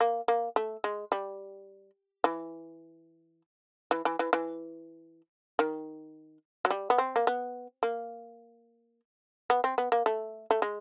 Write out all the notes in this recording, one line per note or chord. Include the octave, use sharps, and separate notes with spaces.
A#3
A#3
A3
G#3
G3
E3
E3
E3
E3
E3
D#3
F#3
G3
B3
C4
A#3
B3
A#3
B3
C4
B3
A#3
A3
A3
G#3